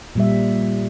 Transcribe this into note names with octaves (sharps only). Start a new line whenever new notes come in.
A#2 G3 E5